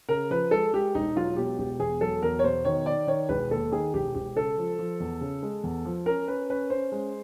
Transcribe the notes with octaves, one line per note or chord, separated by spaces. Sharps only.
C#3 A#4
F3 B4
G#3 A4
G#3 G4
E1 D#4
F#3 F4
B2 G4
E1 G4
E2 G#4
F#3 A4
E2 A#4
C#5
B2 C5
D#3 C#5
D#3 D5
D#3 C#5
E1 B4
D#2 A4
D#3 G#4
E1 G4
E1 G4
C#3 A4
F3
F3
E2
C#3
G#3
E2
F3
C#4 A#4
C#4 B4
C#4 B4
C#4 C5
G#3